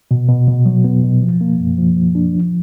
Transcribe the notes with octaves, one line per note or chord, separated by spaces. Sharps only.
B2
B2
B2
F#3
B3
B2
F3
A#3
F#2
F3
F3
D4
F3